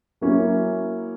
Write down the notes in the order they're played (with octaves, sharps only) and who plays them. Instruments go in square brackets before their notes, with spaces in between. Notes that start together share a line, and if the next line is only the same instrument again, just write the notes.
[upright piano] F#3 A#3 C#4 E4